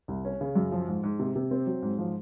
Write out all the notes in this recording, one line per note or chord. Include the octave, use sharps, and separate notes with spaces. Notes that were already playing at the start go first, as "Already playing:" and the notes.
C2
C#4
C#3
F#2
F3
G#2
G#2
C3
C3
C4
F#3
G#2
F3